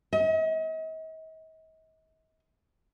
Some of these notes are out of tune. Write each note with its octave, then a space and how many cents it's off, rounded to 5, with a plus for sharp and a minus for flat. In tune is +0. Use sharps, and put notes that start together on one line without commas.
D#5 +45